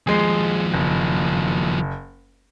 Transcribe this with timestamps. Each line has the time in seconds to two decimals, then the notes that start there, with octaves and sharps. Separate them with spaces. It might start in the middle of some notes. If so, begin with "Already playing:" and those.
0.07 D#2 F3 G#3 G#4
0.74 F#1